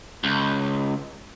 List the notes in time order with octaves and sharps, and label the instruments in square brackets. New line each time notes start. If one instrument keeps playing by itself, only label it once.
[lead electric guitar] C#2